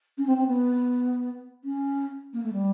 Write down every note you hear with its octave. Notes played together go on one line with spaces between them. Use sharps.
C#4
C4
C4
B3
C#4
A#3
A3
G3